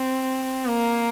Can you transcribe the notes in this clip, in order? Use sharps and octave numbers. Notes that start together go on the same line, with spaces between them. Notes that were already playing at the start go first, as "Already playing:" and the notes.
Already playing: C4
A#3